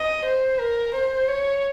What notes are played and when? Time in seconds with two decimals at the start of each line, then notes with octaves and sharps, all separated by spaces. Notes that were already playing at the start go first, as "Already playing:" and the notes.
Already playing: D#5
0.25 C5
0.59 A#4
0.94 C5
1.28 C#5